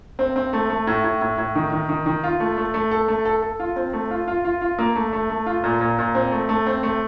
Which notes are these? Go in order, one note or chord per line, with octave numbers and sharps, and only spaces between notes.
C4
C4
A3
A3
A2
A2
A2
A2
D#3
D#3
D#3
D#3
F4
A3
A3
A3
A4
A3
A4
A4
F4
C4
A3
F4
F4
F4
F4
A#3
A3
A3
A3
F4
A#2
A#2
A#2
C4
A3
A3
C4
A3